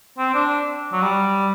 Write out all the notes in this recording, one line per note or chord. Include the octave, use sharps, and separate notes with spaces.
C4
D4
F#3
G3